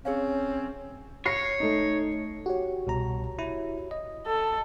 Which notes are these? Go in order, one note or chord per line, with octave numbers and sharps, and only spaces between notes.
C4 C#4 G#4 C#5 F5
C#5 A#6 C7 C#7
A3 D#4
F#4 G4 C#5
C2 B2 A#5
E4
D#5
A4